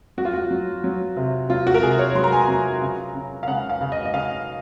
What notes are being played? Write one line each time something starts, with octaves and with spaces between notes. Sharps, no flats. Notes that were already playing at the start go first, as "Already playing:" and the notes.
F#3 F#4
F4
F#4
F#3
F#3
C3
F#3 F4
F#4
A#4
C3 G#4
C#5
F#3 C6
A#5
G#5
A#5
F#3
C#3
C#3
F5
C#3 F#5
F5
C#3
D#5
D#5
C#3 F5